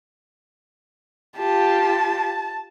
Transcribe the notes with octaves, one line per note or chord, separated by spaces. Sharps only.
F4 G4 A5